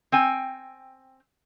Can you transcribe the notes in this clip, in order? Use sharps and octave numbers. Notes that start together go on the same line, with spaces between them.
C4 G5 G#5